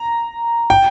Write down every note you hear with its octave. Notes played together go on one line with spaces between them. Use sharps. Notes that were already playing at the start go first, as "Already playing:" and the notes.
Already playing: A#5
G5